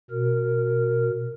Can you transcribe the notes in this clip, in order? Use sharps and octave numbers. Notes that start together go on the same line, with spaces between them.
B2 A#4